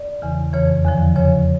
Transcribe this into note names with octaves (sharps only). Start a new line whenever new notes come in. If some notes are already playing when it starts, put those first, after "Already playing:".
Already playing: D5
E2 C#3 E3
F2 C#3 E3 C#5
E2 D3 F3
E2 C#3 F3 C#5